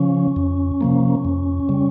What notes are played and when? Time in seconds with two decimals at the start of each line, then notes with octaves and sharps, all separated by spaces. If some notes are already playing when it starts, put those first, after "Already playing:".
Already playing: C#3 F3 C#4
0.36 F2
0.81 C3 F3 A#3
1.25 F2
1.69 C#3 G3